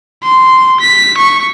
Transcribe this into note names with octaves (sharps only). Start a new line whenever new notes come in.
C6
B6
C#6